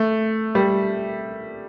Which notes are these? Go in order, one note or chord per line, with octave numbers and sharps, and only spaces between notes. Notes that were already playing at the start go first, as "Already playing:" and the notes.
Already playing: A3
G3